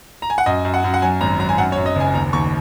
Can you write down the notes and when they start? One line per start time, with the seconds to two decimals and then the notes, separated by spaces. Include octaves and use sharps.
0.22 A#5
0.30 G#5
0.38 F#5
0.46 F#2 D#5
0.65 F#2
0.74 F#5
0.84 F#2
0.94 F#5
1.02 F#3 G#5
1.21 G#1 A#5
1.39 F#3 A#5
1.49 G#5
1.58 F#2 F#5
1.72 C#5
1.77 F#2
1.86 D#5
1.96 F#1 G#5
2.14 D#2 A#5
2.33 D#2 C#6